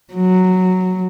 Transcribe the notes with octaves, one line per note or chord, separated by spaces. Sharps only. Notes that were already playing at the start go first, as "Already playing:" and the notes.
F#3